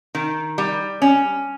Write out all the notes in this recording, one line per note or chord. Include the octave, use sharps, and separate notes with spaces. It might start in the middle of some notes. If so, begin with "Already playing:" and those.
D#3
G3
C#4